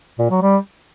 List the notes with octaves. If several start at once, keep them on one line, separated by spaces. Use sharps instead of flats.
A#2
F#3
G3